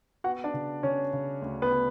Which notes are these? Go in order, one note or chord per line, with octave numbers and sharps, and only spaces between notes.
B3 F#4 F#5
D4 D5
C#3
C#3 C#4 C#5
C#3
D2
B3 B4
B3